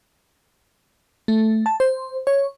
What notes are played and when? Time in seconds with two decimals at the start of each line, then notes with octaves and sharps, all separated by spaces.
1.28 A3
1.66 A5
1.80 C5
2.27 C#5